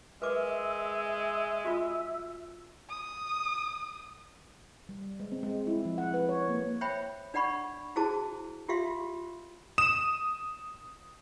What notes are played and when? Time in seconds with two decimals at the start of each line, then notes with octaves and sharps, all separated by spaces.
0.22 G#3 A#4 B4 E5 D6
1.65 F4 F#4
2.89 D#6
4.89 G3
5.20 G#3
5.32 C4
5.43 G#3
5.67 E4
5.85 F3
5.98 F#5
6.14 B4
6.29 C#5
6.49 A#3
6.81 C5 C#5 E5 G5 B5
7.34 D4 D5 F#5 B5 C#6
7.96 E4 F#4 G#4 C5 A5 D6
8.68 F4 G4 E5 F5 C6
9.78 D#6 E7